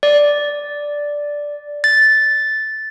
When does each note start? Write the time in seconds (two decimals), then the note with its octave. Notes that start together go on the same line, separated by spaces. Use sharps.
0.03 D5
1.84 A6